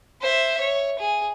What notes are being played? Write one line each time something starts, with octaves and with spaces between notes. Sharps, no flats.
C5 E5
C#5
G#4